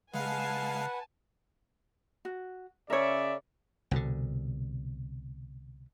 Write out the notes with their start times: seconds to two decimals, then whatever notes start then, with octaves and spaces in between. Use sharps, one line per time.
0.14 C#3 G#3 B4 F5 F#5 G#5 A5 C7
2.25 F#4
2.90 C#3 A#4 C#5 D5 E5
3.91 C2 B2 D3